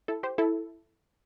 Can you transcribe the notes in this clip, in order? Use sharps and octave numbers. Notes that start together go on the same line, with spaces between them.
E4 A4
G4 C5
E4 A4